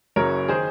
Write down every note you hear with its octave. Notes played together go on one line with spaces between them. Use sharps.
F#1 F#2 C#3 F#3 A#4 C#5
D#3 G#4 C5